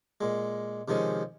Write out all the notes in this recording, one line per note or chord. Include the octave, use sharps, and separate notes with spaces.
A#2 G#3
C3 D#3 F3 G#3 C#4